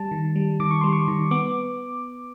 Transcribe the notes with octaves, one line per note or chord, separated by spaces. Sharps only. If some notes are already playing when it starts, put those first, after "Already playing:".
Already playing: G3 A5
D#3
G3
D#3 D6
C#6
G3 C6
C#6
D#3
B3 D6